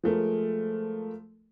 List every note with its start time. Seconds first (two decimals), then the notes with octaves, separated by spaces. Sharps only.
0.04 F3 G#3 A3 A#4